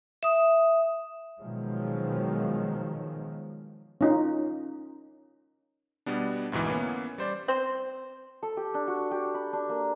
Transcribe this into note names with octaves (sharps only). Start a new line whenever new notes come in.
E5 D#6
B2 D#3 F3 F#3 G#3
C#4 D#4 F4
B2 G3 B3 D4
D2 G#2 B2 E3
E3 A#3 B3 C#4
G3 C5 D5
C4 C5
A4
G4
D4
F#4
G4
B5
D4
A#3